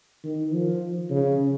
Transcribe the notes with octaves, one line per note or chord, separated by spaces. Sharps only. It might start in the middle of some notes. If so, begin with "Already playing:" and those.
D#3
F3
C#3